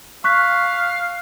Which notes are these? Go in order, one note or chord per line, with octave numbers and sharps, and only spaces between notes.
F5 C#6 F#6 B6